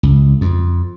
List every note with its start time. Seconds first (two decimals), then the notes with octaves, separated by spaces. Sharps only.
0.03 C#2
0.41 F2